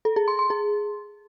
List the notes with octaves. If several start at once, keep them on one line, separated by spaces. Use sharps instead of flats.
A4
G#4
C6
C6
G#4